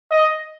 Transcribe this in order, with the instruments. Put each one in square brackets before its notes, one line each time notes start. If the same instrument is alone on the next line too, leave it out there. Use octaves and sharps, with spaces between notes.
[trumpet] D#5